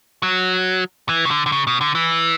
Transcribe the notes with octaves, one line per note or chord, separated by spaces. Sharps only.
F#3
E3
C#3
D3
D3
C#3
B2
D3
E3